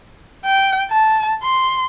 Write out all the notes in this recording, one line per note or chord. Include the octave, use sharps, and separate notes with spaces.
G5
A5
C6